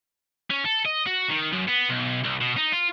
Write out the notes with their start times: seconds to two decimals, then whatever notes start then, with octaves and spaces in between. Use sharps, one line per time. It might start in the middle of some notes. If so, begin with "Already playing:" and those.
0.51 C#4
0.65 A4
0.85 D#5
1.06 F#4
1.30 D#3
1.53 F#2
1.68 B3
1.90 B1
2.24 C2
2.41 B2
2.57 D#4
2.72 F4